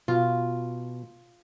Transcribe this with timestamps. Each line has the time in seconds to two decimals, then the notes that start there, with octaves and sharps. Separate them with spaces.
0.08 B2 F4